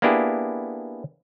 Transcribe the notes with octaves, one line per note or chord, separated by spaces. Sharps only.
A#3 B3 D4 E4 G4 G#4